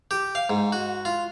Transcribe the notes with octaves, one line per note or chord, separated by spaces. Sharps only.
G4
F5
G#2
F#4
F4